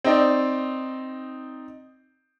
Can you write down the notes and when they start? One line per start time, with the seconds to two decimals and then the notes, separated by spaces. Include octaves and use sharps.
0.04 C4 D#4 D5